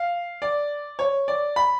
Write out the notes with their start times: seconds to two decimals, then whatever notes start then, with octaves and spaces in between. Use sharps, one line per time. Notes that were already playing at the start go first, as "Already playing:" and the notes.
Already playing: F5
0.42 D5
0.99 C#5
1.28 D5
1.56 B5